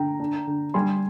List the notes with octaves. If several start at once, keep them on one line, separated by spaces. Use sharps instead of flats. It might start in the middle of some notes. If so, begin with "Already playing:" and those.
Already playing: D3 G5 A#5
D4
D3
G3 G#5 C6